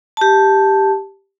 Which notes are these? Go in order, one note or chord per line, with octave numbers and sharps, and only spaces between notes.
G4 A5